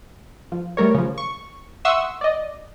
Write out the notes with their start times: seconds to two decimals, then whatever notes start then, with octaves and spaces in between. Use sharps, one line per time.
0.52 F3
0.77 G3 A3 A#4 C#5
0.95 C#3 F3
1.18 C#6
1.85 E5 F#5 C6 C#6 D#6 E6
2.21 D5 D#5